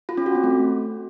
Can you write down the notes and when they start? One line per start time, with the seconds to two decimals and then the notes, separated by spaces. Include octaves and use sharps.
0.09 F4
0.17 C#4
0.26 F#4
0.35 C4
0.44 A3